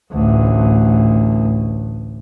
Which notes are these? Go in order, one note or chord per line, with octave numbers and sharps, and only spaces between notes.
A1 D2